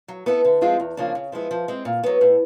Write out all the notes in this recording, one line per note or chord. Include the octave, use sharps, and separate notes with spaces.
F#3
B3 E4 A4
D3
F3 G#3 C4 F4
E2
C#3 F3 A#3 D4
C#3
F3 G#3 B3 E4
F3
G#3 C4
A#2
F#3 B3
A2